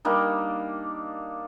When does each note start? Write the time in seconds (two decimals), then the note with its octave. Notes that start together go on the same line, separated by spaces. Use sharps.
0.05 G3 A#3 D4 D#4